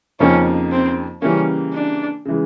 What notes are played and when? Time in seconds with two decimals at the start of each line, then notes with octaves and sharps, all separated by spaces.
0.20 F2 C#3 F3 A#3 C#4 D#4
0.72 C4
1.22 C#3 E3 G3 A#3 C#4
1.74 D4
2.25 C#3 E3 G#3